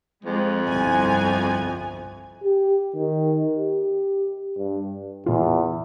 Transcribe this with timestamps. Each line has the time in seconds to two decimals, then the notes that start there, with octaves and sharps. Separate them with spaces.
0.24 F2 G#3
0.65 G1 C2 G#5
2.44 G4
2.95 D#3
3.55 G4
4.58 G2
5.26 E2 A#2 F4